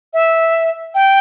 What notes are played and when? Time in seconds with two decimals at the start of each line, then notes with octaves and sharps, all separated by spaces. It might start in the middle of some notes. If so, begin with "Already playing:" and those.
0.13 E5
0.95 G5